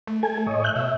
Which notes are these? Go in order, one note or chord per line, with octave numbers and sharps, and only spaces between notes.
A3
A3 A4 G#5
A2 C#5 D#5
E5 F#6 G6
B2 E5